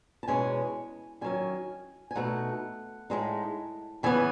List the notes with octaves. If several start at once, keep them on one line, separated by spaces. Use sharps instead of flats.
A5
E2 B2 G#3 C#4 G#5
E2 D#3 F#3 C#4 G#5
G#5
B2 A3 D#4 F#5
A2 G#3 D#4
C#3 E3 B3 G#5